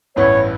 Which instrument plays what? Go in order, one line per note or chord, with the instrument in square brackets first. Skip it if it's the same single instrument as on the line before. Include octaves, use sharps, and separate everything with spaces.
[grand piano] A1 G2 E3 B3 [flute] C#5